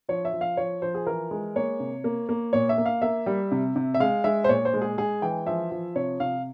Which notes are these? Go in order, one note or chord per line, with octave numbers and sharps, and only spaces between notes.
F3 C#5
E5
F3
F5
F3 C#5
F3 C5
G#4
E3 A#4
G#3
A#3 C#5
C3
A#3
A#3
A#2 C#5
E5
A#3
F5
A#3 E5
G3
C3
C3
E5
G#3 F5
G#3 E5
C5
A#2 C#5
C5
G#3
G#4
G#3 G#4
E3 G5
F3 E5
F3
C3 C#5
C3 F5